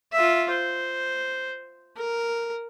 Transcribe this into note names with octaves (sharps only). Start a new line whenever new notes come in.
F4 E5
C5
A#4